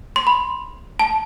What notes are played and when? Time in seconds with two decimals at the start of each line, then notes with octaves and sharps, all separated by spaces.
0.16 C6
0.27 B5
0.99 A5